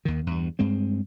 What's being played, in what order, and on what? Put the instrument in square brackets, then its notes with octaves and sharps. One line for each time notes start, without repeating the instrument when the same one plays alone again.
[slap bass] D#2 D#3
E2 G2
G2 G#3 C4